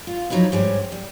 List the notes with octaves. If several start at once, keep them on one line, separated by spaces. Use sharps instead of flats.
F4
F3 F#3 D#4 E4 B4
G#2 G3 C#4
G3